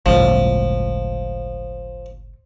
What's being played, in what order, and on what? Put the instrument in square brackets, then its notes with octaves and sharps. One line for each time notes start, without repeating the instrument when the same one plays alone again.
[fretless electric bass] G1 C#2 A2 [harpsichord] F3